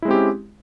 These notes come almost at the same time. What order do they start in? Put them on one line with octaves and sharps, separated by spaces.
E4 G#3 C4 G4 C#4